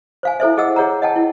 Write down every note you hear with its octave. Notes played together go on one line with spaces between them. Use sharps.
C5 F5 G#5
E4 A4 C5 E5
G#4 D#5 F#5 E6
G#4 C#5 F#5 A#5
D#5 F#5 G5 A5
E4